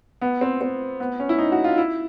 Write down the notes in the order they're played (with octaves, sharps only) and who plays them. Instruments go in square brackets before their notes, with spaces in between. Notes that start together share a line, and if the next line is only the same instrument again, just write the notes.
[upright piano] B3
C4
C4
B3
C#4
E4
D#4
F#4
F4
E4